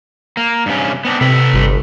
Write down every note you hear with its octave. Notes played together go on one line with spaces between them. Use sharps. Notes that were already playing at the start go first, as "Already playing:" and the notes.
A#3
G2 C3 C#4
B3 C4 D4
C3 A4 B4
G1